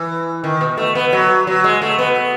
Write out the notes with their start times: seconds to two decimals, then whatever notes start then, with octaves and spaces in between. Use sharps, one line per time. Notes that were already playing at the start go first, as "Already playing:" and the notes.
Already playing: E3
0.44 D#3
0.61 B2
0.77 A3
0.95 B3
1.13 F#3
1.47 F#3
1.64 G#3
1.82 A3
1.98 B3